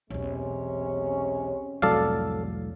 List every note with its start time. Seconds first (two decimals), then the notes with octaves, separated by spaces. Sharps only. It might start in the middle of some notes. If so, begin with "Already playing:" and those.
0.10 B1 E2 C3 G#3 C#4
1.82 C2 F2 A2 F#3 A4 D5 F5